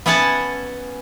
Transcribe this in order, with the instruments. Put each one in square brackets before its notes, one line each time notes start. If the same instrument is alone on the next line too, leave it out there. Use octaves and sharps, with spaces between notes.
[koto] B3 C#4 E5 F#5 G#5 A5